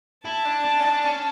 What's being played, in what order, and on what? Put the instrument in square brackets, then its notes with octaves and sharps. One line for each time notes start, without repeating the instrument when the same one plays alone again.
[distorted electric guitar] E4 [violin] A5
[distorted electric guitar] D4
D4
C#4
D4
C#4